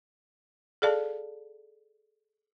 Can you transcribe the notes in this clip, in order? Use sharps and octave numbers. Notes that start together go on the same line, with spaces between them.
G#4 A4 D5 F5 A5